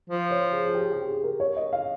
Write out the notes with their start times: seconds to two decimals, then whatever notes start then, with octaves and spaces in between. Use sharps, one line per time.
0.10 F3
0.31 C#5
0.53 G#4
0.67 G#4
0.75 G4
0.92 G4
1.07 G#4
1.23 A#4
1.40 C#5
1.56 D#5
1.73 F5